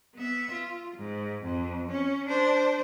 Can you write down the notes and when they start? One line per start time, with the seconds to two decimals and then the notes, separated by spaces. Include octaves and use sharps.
0.15 B3 E5
0.52 F4
0.97 G#2
1.42 F2
1.91 C#4
2.28 D4 C5